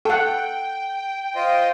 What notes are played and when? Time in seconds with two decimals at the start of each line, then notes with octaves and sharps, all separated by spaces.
0.05 A4 F#5 G5
1.36 F4 C5 D#5